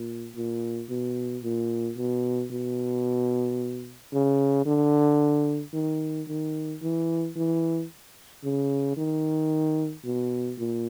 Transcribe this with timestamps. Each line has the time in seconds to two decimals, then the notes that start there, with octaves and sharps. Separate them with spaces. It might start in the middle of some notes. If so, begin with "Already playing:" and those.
Already playing: A#2
0.35 A#2
0.89 B2
1.43 A#2
1.97 B2
2.51 B2
4.12 C#3
4.66 D3
5.74 D#3
6.28 D#3
6.82 E3
7.36 E3
8.44 C#3
8.97 D#3
10.05 B2
10.59 A#2